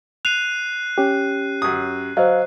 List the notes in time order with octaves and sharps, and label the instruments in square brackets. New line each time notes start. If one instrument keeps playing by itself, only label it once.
[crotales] F#6 C7 D#7 [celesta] F7
[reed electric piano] C#4 G4
[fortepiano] F#2 D#6
[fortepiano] F#3 [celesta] C5 D#5 [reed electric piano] F5